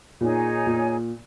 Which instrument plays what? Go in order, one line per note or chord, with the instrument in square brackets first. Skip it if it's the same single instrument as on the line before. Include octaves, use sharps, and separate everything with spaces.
[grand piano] A#2 [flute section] D#4 G#4 C#5 G#5
[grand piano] A#2